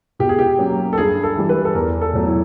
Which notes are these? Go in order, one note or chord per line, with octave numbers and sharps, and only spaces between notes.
B2 G4
G#4
G4
F#3 A#3 C#4
A4
G2 G#4
A4
E3 G3
B4
A4
E2 A#4
A4
B2 F#3 A3
E4